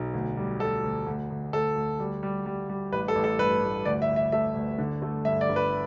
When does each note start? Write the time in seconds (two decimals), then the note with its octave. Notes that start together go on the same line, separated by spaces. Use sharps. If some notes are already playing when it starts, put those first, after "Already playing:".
Already playing: B1
0.14 D2
0.37 G3
0.60 D2 A4
0.84 D2
1.07 D2
1.30 D2
1.53 D2 A4
1.76 D2
2.00 G3
2.23 G3
2.46 G3
2.69 G3
2.92 A1 B4
3.08 A4
3.15 A1
3.24 A4
3.39 G2 B4
3.63 A1
3.85 D2 D5
4.02 E5
4.09 D2
4.16 E5
4.32 A3 E5
4.55 D2
4.78 D3
5.02 A3
5.25 G2 E5
5.41 D5
5.49 G1
5.56 B4